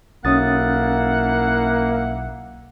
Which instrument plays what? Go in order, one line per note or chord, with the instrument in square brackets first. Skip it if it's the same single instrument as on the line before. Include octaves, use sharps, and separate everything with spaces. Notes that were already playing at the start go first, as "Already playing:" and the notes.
[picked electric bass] B1 [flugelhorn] A#3 [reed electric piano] C#4 D#6 A6 [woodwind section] E4 F5 F#5